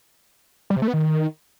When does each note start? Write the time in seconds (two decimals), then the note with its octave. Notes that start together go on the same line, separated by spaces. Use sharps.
0.70 G3
0.76 C3
0.82 A3
0.88 B3
0.94 D#3